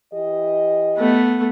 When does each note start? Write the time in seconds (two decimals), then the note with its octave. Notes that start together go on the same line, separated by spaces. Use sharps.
0.13 E3 G4 D#5
0.97 A3 B3